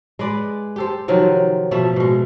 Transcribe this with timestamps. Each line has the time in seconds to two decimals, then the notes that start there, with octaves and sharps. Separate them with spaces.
0.19 G#3 B4 D5
0.76 G4 A4 C5
1.08 C3 D#3 F3 F#3
1.71 B2 F3 A3 E5
1.96 B2 G#3